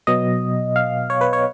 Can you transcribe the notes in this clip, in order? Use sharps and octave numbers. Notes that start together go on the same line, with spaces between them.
B2 F#3 B3 D#5
F5
C#5
B4
C#5